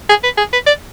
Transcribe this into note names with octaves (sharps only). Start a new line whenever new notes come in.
G#4
B4
G#4
B4
D5